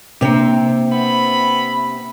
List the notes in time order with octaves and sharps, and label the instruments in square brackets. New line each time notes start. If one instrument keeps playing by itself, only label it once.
[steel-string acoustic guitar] C3 C4 [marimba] A#3 D4
[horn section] B3 E5 B5